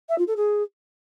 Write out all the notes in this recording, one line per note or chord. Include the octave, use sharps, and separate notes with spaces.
E5
F4
A4
G#4